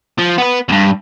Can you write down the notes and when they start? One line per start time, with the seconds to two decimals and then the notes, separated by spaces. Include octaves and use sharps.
0.18 F3
0.38 B3 B4
0.69 E2 G2